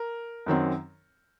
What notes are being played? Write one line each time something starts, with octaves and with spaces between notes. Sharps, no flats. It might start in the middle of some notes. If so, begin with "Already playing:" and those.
Already playing: A#4
F#2 D#3 F#3 C4